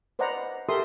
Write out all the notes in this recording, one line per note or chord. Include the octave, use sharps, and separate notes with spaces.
B4 C5 D5 D#5 F#5 A#5
G4 A4 A#4 E5 C6 D#6